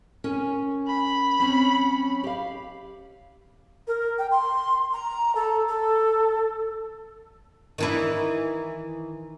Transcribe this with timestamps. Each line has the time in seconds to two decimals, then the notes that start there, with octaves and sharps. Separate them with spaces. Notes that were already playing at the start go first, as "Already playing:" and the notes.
0.24 C#4 A#4 G#5
0.87 B5
1.39 F#3 C4 C#4
2.24 G4 F5
3.87 A#4
4.18 G5
4.31 C6
4.93 A#5
5.35 A4
5.68 A4
7.78 D#3 E3 E4